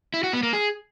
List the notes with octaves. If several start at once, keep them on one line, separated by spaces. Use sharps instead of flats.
E4
F#4
B3
A#3
G#4